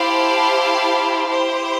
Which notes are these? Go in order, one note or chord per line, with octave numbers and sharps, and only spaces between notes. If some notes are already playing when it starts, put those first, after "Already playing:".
Already playing: E4 G4 C5 F5 A5
E4 G4 C5